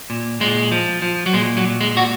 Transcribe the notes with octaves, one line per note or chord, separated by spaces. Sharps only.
A#2
A#2 G#3
F3
F3
F#3
A#2 G#3
F#3
A#2
G#3
A#2 F#4